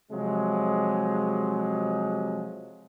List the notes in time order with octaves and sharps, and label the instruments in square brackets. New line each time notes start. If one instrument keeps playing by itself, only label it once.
[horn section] C3 F3 F#3 G#3